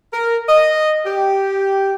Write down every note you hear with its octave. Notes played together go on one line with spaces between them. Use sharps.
A#4
D#5
G4